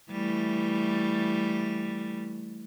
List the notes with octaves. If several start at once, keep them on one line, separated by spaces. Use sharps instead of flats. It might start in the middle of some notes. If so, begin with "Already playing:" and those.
E3 G3 A3